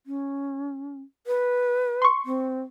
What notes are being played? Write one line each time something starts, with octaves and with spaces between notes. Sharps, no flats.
C#4
B4
C6 C#6
C4